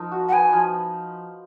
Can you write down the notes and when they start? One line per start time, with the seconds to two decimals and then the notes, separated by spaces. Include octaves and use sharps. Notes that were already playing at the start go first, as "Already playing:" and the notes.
Already playing: F3 D#4 A#4
0.12 F#4
0.28 F#5
0.32 B3 G#5
0.53 F3